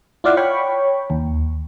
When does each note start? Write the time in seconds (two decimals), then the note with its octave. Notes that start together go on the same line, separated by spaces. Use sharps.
0.24 E4 F4 D5 F5 F#5
0.37 C#5 G5 B5 C#6
1.10 D#2